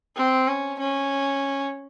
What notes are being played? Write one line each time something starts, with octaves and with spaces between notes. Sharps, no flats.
C4
C#4
C#4